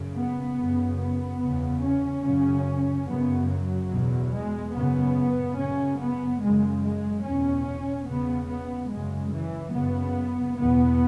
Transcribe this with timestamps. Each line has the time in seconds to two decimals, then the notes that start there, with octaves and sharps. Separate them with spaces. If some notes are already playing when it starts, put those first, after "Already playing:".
Already playing: F#2 C#3
0.17 B3
0.58 F#2 C#3
0.99 B3
1.41 E2 C#3
1.83 C#4
2.25 F#2 C#3
3.08 F#2 C#3 B3
3.50 F#3
3.92 E2 B2
4.33 G#3
4.74 F#2 C#3 B3
5.58 F#2 C#3 C#4
6.00 B3
6.41 F#2 C#3 G#3
6.83 G#3
7.25 E2 B2 C#4
8.07 E2 C#3 B3
8.50 B3
8.91 F#2 C#3 G#3
9.33 E3
9.75 F#2 C#3 B3
10.58 E2 B2 B3